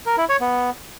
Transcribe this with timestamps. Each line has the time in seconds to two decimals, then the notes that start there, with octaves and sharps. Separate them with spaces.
0.06 A#4
0.18 E4
0.29 C#5
0.41 B3